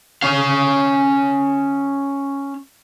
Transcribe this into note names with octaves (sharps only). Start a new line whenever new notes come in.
C#4 F5